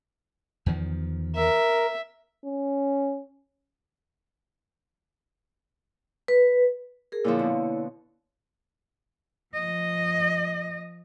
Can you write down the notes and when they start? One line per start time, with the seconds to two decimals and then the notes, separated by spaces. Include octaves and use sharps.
0.66 E2 D#3 F3
1.36 A#4 E5
2.45 C#4
6.28 B4
7.12 G#4 A#4
7.25 A#2 D3 F3 E4 C#5
7.39 B2
9.54 F3 D#5